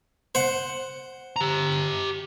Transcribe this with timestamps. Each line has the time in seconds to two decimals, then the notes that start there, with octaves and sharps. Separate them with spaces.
0.35 C5 F#5
1.36 G4 A#5